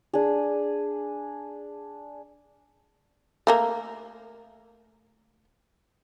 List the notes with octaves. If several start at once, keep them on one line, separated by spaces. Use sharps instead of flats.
D4 G#4
A3 A#3 A#4